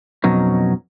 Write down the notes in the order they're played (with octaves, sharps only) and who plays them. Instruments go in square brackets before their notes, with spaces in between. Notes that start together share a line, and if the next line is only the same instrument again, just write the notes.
[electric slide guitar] F2 B2 F#3 C#4 D#4